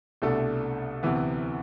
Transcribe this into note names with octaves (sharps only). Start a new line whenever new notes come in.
C2 B2 A3 D4 A4
D2 C3 E3 B3